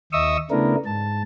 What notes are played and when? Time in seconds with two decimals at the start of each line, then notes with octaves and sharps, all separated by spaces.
0.13 D#2 D#5 E5 C#6 D#6 E6
0.51 C#3 A3 B3 D4 E4 A#4
0.85 G#2 A5